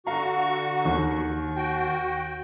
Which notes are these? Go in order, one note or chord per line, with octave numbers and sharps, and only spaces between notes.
D3 F#4 F5 A#5 C#6
D#2
F#4 G5